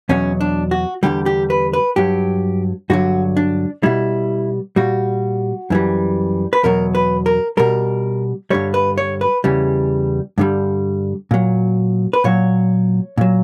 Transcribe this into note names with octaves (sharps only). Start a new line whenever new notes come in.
E2 B2 F#3 C#4
D4
F#4
E2 D3 G3 G4
G4
B4
B4
G2 F#3 G4
G2 D3 F#3 F#4
D4
B2 G3 E4
A#2 G3 F#4
F#2 E3 G3
B4
E2 B2 F#3 A#4
B4
A#4
B2 G3 A#4
G2 D3 G3 C#5
B4
C#5
B4
E2 C#3 E3 G3
G2 D3 G3
A#2 F#3
B4
A#2 F#3 C#5
A#2 F#3